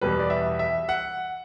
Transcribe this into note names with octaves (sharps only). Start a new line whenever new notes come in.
E2 B2 G3 B4
D5
E5
E5
F#5